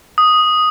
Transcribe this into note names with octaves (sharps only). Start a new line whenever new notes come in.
D#6